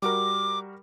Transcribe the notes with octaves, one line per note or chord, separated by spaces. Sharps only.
G3 F#4 A#4 D6